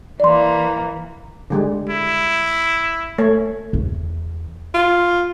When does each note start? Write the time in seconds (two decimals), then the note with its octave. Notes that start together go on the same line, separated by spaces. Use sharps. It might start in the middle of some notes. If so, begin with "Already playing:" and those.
0.20 E3 A#3 D5 C6
1.50 D3 G3 G#3
1.89 E4
3.18 A3 C#5
3.73 E2
4.74 F4